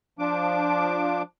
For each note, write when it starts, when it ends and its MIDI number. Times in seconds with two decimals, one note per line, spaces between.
0.19 1.22 53
0.19 1.22 62
0.19 1.22 86